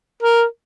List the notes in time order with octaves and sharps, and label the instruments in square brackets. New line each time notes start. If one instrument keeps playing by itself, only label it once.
[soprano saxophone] A#4